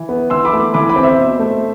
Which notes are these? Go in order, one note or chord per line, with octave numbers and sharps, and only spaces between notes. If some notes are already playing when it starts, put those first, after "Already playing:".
Already playing: E3
B3
E3 C6 E6
B5 D6
A3
E3 B5 D6
B5 D6
C4
C5 E5
B2
A3